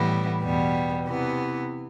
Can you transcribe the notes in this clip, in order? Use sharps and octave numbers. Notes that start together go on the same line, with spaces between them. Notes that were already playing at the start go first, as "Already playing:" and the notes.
Already playing: A2 E3 G3 B3 E4
E2 B2 G3 B3
C3 E3 B3